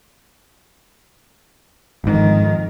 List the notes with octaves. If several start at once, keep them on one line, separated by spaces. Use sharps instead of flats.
G1 F2 G#2 D#3